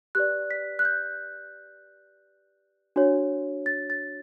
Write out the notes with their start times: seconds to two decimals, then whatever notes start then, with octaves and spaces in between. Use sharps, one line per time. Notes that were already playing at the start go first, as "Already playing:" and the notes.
0.15 G4 B4 D5 F#6
0.51 B6
0.79 F#6
0.85 G6
2.96 D4 F#4 C#5
3.66 A6
3.90 A6